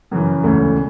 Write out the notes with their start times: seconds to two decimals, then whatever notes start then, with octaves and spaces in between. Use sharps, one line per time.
0.11 F#2 C#3 E3
0.43 E1 D2 C#3 E3 A3